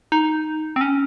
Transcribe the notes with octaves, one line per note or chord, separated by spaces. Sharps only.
D#4
C4
C#4